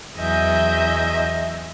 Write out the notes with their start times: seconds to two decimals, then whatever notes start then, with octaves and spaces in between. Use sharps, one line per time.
0.18 E2 F#3 D#5 E5 G#5 G6